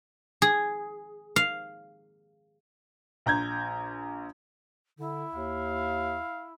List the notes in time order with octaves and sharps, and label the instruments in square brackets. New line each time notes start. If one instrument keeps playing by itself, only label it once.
[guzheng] G#4
F5
[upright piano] A#1 A#5 G6 G#6
[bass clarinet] D3 [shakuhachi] E4
[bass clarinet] D#2 [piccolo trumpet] F5